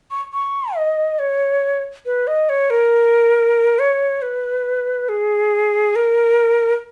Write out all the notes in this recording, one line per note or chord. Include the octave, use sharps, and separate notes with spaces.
C#6
C#6
D#5
C#5
B4
D#5
C#5
A#4
C#5
B4
G#4
A#4